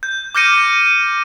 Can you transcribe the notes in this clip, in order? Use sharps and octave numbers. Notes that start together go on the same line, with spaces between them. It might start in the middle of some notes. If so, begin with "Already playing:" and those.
G6
D6 F6 G6 A#6 C#7 D#7